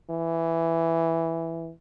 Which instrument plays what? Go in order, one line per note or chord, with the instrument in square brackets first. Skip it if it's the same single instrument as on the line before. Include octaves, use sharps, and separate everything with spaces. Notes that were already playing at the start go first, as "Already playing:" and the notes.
[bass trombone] E3